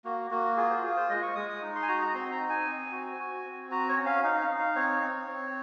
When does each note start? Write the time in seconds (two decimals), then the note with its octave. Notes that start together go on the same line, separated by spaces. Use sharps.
0.04 A#3 F#4
0.30 A#3 F#4
0.57 F4 G#4
0.70 C5
0.83 F4 G#4
0.97 C5
1.09 G#3 D#5
1.23 C#6
1.35 G#3 D#6
1.49 D#6
1.62 D#4
1.75 C6
1.82 G#5
1.88 F#4 A#5
2.01 A#5
2.14 C4 C6
2.31 A#5
2.40 D#4
2.49 G#5
2.66 C4
2.92 F#4
3.19 F#4
3.45 C4
3.71 F#4 A#5
3.89 C#5
3.97 C#4
4.06 F5
4.24 D#4 F5
4.41 F5
4.49 D#4
4.59 F5
4.75 C4 C#5
5.02 C4
5.27 C4